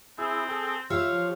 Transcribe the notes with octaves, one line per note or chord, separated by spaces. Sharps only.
C4 E4 G#4
G#4 A4 G5
F4 G4 C#5 E5 F5
F3